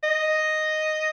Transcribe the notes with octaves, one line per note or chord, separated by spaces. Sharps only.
D#5